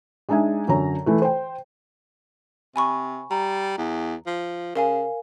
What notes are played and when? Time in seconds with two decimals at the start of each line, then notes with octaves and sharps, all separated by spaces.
0.29 G#3 D4 D#4 E5 G#5
0.68 F#2 D3 C#5 A#5
1.06 E3 A3
1.22 C5 G5
2.76 C3 G#5 B5 C#6
3.31 G3 A#5
3.78 E2
4.27 F3
4.76 C#3 A#4 F5 G#5